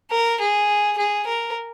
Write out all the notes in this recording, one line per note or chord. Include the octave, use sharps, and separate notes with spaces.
A#4
G#4
G#4
A#4